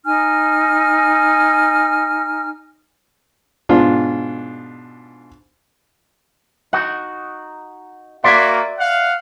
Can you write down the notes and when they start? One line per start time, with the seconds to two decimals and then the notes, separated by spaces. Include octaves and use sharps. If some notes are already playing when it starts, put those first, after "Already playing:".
0.05 D#4 G#5 F6
3.69 G#2 B2 D4 F4
6.73 D#4 F#4 F#5
8.24 A#3 F#4 D5 E5 C6 D6 G#6
8.79 F5 F#5